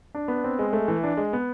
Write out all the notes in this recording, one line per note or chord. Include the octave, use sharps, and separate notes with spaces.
D4
B3
C4
G#3
A3
E3
D4
G#3
B3